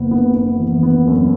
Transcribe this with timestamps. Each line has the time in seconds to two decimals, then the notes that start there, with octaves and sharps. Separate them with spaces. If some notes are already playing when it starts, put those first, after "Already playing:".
Already playing: F#1 B3
0.11 B3
0.34 B3
0.59 E3
0.83 B3
1.07 F#2